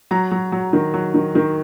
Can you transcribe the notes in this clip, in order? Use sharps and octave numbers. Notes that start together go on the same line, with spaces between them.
F#3 A#5
F#3
F#3
D#3
F#3
D#3
D#3